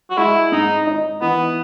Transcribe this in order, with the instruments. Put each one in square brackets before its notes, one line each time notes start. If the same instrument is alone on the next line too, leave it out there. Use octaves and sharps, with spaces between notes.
[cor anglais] F#4
[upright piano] G#3 [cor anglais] E4
[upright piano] G#2 [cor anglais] D#4
[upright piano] D#4
[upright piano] E3 [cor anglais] B3